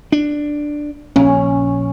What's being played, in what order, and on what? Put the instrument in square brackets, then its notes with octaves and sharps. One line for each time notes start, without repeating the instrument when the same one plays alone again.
[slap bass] D4
[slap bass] A#1 [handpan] C#4